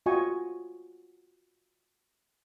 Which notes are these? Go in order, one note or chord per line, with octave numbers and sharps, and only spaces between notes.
F4 F#4 D#5 G5 G#5 C#6